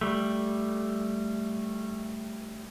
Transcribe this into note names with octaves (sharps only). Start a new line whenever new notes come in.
G3 A3